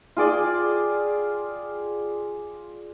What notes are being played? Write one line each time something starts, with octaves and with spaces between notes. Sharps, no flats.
F4 G#4 D5 G5